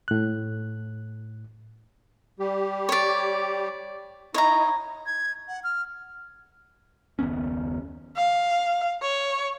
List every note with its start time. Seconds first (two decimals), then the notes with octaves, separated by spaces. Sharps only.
0.08 A2 F#6
2.39 G3 G4
2.89 C#5 D5
4.34 D#4 E4 C#5 D#5 A#5
5.06 G#6
5.48 F#5
5.64 F6
7.19 F#1 D#2 B3 C#4
8.16 F5
9.02 C#5